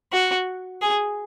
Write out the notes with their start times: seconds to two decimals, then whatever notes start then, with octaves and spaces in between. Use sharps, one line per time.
0.12 F#4
0.82 G#4